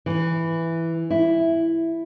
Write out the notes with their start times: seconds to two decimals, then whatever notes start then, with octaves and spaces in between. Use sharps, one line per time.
0.06 E3
1.10 E4